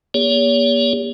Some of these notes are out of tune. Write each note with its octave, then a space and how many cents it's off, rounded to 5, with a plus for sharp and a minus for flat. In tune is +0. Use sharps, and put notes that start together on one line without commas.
A#3 +40 G4 +45 C#5 +40